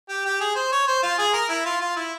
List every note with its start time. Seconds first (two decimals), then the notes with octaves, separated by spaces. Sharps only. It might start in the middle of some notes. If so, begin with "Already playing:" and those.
0.09 G4
0.25 G4
0.41 G#4
0.55 C5
0.72 C#5
0.88 C5
1.03 F4
1.19 G#4
1.33 A#4
1.49 E4
1.65 F4
1.81 F4
1.96 E4